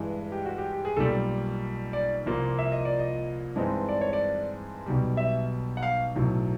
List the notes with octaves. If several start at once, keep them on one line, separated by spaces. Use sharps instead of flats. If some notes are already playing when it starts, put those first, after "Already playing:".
Already playing: G2 E3 G#3
G4
F#4
G4
G4
G#4
B1 A#2 G3 A4
D5
C2 A#2 F3 A#3
E5
D#5
D5
D#5
G2 E3 G#3 C4 D#4
D5
C#5
D5
B1 B2 G3
E5
F#5
F5
B1 A2 F#3